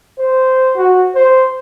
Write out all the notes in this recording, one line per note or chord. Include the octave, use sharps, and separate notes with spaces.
C5
F#4
C5